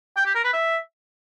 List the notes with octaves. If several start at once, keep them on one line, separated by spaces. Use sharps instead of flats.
G5
G4
A#4
B4
E5